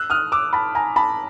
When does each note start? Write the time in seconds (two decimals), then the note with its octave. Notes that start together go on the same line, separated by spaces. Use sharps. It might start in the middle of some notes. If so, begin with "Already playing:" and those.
Already playing: E6 F#6
0.10 D#6 F6
0.32 D6 E6
0.53 A5 B5
0.75 G#5 A#5
0.96 A5 B5